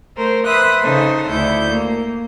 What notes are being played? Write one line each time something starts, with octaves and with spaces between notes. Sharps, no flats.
A3 A#4 C5
B4 C5 E5 D#6 F#6
C#3 D#4 A4 C5
D2 E4 G6
A#3